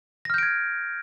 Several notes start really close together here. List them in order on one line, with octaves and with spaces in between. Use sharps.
A#6 F6 G6 D7 G#6